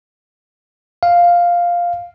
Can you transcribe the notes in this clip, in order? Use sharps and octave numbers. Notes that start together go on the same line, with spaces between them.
F5